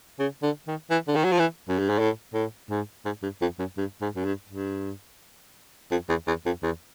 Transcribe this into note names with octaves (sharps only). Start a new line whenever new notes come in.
C#3
D3
D#3
E3
D3
D#3
F#3
F3
E3
F#2
G2
G#2
A2
A2
G#2
G#2
G2
F2
F#2
G2
G#2
F#2
G2
G2
F2
E2
E2
F2
E2